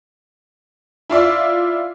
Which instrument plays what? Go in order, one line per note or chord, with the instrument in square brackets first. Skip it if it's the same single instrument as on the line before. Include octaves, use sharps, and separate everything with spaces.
[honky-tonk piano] E4 F4 D5 E5